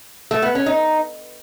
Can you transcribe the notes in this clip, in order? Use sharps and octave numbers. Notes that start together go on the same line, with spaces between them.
A3
B3
C#4
D#4